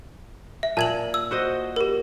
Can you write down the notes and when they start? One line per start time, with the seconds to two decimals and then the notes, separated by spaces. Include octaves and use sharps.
0.63 E5
0.77 A#2 A5 G#6 F#7
1.14 E6
1.31 F#4 C5 D#5
1.76 G4 A#4